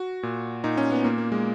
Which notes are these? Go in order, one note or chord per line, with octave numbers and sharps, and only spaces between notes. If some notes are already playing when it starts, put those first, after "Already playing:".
Already playing: F#4
A#2
A#2 D#4
C#4
B3
A#2 A#3
A#3
G#3